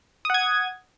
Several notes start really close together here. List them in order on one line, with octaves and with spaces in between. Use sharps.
D#6 F#5 G#6